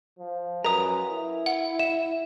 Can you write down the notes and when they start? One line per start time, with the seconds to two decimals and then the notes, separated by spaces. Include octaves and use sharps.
0.19 F3
0.64 F#2 A#4 B4 D#5 A#5 D#6
1.08 E4
1.46 F#5
1.79 E5 E7